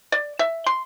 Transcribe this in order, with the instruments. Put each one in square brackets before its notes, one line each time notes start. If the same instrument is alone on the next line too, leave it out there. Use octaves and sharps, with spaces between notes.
[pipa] D5
E5
C6